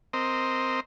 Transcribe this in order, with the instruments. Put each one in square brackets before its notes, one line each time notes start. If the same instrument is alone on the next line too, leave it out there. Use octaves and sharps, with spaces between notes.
[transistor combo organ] C4 A#4 C5 D#5